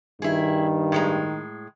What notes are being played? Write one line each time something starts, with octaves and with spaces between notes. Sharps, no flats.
G2 D#3 E4 G#4
A2 G#3 A#5